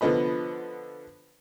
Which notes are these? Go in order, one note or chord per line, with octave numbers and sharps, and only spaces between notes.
D3 F3 B3 D#5 B5